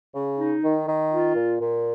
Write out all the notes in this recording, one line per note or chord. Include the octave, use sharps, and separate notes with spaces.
C#3
D#4
D#3
D#3
F4
A#2
A#2